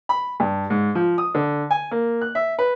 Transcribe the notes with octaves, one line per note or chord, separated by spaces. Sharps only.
B5
G2
G#2
F3
D#6
D3
G#5
A#3
F#6
E5
B4